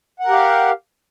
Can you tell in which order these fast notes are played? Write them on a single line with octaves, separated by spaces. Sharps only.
F#5 A#4 G4 F5